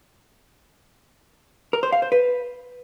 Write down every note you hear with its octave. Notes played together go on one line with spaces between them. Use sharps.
A#4
C5
F5
C5
B4